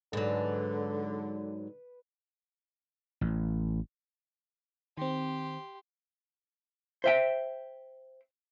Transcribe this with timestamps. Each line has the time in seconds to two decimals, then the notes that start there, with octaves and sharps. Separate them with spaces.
0.13 G#2 D3 F#3 B4
3.21 A1
4.97 D#3 C4 G4 C6
7.04 C5 E5 G5